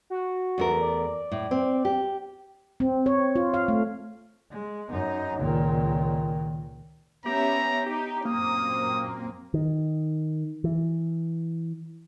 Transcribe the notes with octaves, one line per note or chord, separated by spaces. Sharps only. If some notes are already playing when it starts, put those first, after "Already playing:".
F#4
E2 A3 A#4
D5
A2
C4
G4
C4
C#5
F4
F5
A3
G#3
F#2 D#4
C#2 A#2 D#3
B3 C#4 G4 E5 A#5
D#4 G4
F#2 A#2 A#3 C4 D#6
D#3
E3